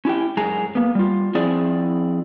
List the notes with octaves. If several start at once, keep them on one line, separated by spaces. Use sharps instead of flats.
C#4 E4 G4 G5
F#2 G#3 G#4 A#5
A#3 B3
G3 F4
F3 C4 E4 G#4 D5